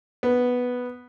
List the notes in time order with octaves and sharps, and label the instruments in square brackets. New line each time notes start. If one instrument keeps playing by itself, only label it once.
[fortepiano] B3